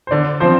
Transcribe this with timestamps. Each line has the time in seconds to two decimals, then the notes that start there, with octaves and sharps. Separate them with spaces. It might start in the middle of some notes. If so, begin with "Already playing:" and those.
0.07 C5
0.11 D3 D5
0.40 F3 C4 C5